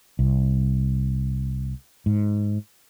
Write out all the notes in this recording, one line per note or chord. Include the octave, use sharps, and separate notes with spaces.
C2
G#2